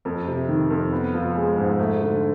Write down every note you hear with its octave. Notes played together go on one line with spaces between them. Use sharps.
F2
C3
D#3
F2
B3
F3
G#3
G#2
A3
D3